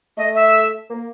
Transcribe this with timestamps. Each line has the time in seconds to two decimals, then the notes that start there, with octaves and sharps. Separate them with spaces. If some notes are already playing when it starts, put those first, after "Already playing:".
0.17 A3 D#5
0.35 E5
0.90 A#3